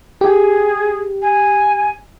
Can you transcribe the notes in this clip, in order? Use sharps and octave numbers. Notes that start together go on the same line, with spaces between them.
G4 G#4
G#5